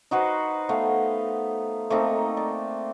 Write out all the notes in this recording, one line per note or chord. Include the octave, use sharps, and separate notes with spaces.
D#4 F#4 B4 C5
A3 B3 F5
A3 A#3 C4 D#4
D5